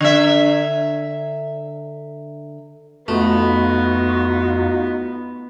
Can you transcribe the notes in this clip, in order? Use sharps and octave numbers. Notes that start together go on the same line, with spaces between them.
D3 E5
F2 A3 B3 D#4 F4 F#4